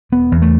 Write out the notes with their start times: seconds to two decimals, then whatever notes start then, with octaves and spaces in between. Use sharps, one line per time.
0.12 E1 B3
0.32 E2
0.42 A3